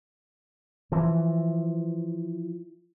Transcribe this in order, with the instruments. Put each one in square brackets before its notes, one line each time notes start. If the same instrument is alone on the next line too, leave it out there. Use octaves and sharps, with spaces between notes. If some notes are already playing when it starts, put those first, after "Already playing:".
[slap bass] E3 F3